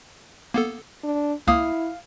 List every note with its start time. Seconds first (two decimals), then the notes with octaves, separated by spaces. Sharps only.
0.54 A#3 B3 A4
1.04 D4
1.48 C#2 A#3 E4 F5 D#6